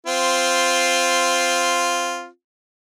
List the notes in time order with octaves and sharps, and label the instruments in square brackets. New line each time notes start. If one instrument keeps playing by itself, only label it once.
[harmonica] C4 F4